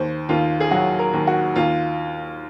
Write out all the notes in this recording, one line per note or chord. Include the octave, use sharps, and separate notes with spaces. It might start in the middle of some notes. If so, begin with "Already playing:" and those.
Already playing: D#2 C5
D#2 F4
G#4
F#3 F#4
A#4
D#2
F#4
D#2 F4